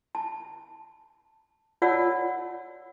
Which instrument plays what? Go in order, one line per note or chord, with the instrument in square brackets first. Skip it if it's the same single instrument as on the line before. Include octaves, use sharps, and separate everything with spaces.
[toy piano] A5
F4 C#5 D5 F#5 A5 E6